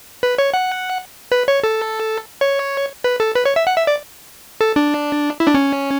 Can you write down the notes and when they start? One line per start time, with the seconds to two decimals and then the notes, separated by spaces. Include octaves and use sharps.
0.23 B4
0.38 C#5
0.54 F#5
1.32 B4
1.48 C#5
1.64 A4
2.41 C#5
3.04 B4
3.20 A4
3.35 B4
3.45 C#5
3.56 E5
3.67 F#5
3.77 E5
3.87 D5
4.61 A4
4.76 D4
5.40 E4
5.47 D4
5.54 C#4